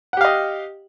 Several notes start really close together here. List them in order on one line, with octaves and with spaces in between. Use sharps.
F#5 G4 F5 D#5